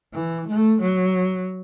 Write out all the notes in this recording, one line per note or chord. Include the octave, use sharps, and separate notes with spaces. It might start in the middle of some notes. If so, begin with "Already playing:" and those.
E3
A3
F#3